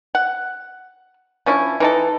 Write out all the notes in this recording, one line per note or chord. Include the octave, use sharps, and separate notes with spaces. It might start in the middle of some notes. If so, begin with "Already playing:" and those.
F#5
F3 C#4 D4 E4
E3 D#4 A4